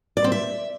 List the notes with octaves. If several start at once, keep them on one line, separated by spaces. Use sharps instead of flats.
D5
C4
E5